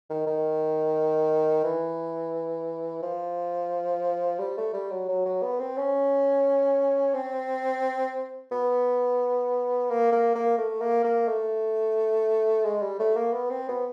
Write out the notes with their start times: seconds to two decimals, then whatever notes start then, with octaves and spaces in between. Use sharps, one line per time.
0.10 D#3
0.27 D#3
1.64 E3
3.02 F3
4.39 G3
4.58 A3
4.74 G3
4.91 F#3
5.09 F#3
5.25 F#3
5.43 B3
5.60 C4
5.77 C#4
7.14 C4
8.52 B3
9.90 A#3
10.12 A#3
10.35 A#3
10.58 A3
10.81 A#3
11.04 A#3
11.28 A3
12.65 G#3
12.82 G3
12.99 A3
13.16 A#3
13.33 B3
13.50 C4
13.69 B3